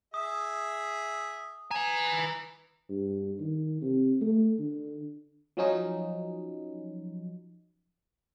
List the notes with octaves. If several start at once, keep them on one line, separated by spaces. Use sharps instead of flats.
G#4 E5 D#6
B4 G#5 A#5
G2
D#3
C3
A3
D3
F3 F#3 C#4 D#4